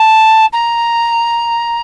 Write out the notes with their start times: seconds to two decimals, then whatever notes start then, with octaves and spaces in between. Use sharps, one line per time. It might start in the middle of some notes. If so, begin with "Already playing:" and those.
Already playing: A5
0.53 A#5